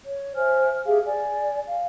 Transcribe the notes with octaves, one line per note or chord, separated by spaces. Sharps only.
C#5
C5 E5 G#5 F6
G4 G#4 E5 F5
D5 G#5
F5